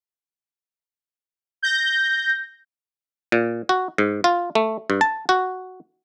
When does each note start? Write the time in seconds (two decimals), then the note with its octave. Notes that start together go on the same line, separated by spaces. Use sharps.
1.62 G6 A#6
3.32 A#2
3.69 F#4
3.98 G#2
4.24 F4
4.55 A3
4.90 G2
5.01 A5
5.29 F#4